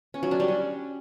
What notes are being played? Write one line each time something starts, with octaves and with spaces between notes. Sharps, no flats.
C#4
F#3
D4
G3
C#4